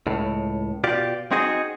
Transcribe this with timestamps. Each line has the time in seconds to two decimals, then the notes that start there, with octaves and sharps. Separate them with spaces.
0.07 C#2 A2
0.84 B2 F4 G4 D5
1.31 C4 D#4 F#4 G#4 D#5